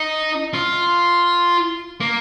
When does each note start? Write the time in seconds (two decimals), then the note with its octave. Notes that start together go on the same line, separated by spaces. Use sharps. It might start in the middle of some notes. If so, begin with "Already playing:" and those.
Already playing: D#4
0.54 F4
2.00 A#3